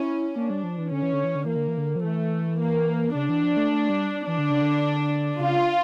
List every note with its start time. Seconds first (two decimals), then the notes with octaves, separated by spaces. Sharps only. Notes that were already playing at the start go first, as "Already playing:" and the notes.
Already playing: C#4 E4
0.36 A#3 D4
0.50 G3
0.63 F3
0.78 E3
0.92 D3 C#4
1.03 E3
1.13 D3
1.24 E3
1.35 D3
1.46 E3 A#3
1.56 D3
1.68 E3
1.78 D3
1.96 F3
2.03 E3 A3
2.59 A#3
3.15 C#3 D4
3.29 E3
3.43 F3
3.57 A3
3.71 A3
3.89 G3
4.27 E3 D4
4.38 D3
4.50 C#3
4.62 D3
5.38 C#3 F4